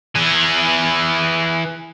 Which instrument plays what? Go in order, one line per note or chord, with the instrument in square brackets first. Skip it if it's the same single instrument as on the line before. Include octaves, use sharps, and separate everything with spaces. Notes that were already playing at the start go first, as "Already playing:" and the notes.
[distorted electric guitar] E3 G#4